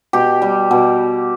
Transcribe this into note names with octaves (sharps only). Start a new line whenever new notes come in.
B2 G4
G3
B2